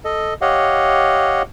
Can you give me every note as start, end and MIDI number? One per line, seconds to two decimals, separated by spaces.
0.05 0.34 69
0.05 0.34 75
0.41 1.42 67
0.41 1.42 73
0.41 1.42 75
0.41 1.42 77
0.41 1.42 78